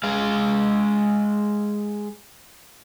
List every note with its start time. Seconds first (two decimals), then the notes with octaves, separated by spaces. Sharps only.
0.04 G#3 F5